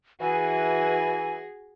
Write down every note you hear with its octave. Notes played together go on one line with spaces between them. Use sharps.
E3 F#4 G#4 G#5